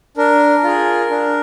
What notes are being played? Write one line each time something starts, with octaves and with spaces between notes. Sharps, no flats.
D4 A#4
F4 G#4
D4